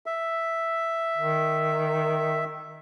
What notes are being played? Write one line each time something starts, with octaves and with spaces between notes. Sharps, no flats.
E5
D#3